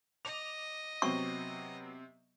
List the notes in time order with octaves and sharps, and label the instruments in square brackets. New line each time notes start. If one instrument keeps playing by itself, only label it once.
[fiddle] D#5 [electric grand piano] D6 [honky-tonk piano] F7
[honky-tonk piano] C3 C4 [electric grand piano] F#3 B3 [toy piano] C#6